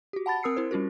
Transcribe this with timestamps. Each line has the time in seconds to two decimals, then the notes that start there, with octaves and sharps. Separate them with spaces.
0.13 F#4 G4
0.26 F#5 A5 B5 A6
0.43 C4 A#4 D#6 E6 C7 C#7
0.57 E4 A#4 C5
0.71 G3 C#4 F4 F#4 A#4